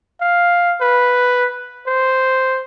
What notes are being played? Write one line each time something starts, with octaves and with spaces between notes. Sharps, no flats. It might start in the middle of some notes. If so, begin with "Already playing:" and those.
F5
B4
C5